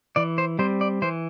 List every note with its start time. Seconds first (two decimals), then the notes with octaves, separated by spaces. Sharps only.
0.16 E3 D5
0.38 C5
0.59 G3 C4 C5
0.81 D5
1.02 E3 C5